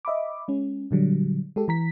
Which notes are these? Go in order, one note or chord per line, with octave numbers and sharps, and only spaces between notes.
D#5 E5 B5 D6
G#3 C#4
A#2 D3 F#3 G3
G#3 G4 A4
E3 A#5 B6